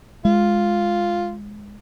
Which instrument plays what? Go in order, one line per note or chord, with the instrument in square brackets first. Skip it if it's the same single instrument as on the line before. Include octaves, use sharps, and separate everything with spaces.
[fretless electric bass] G#3 [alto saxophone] F4